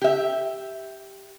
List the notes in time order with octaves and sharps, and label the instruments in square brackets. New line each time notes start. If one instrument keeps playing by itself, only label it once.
[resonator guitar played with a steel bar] G4 E5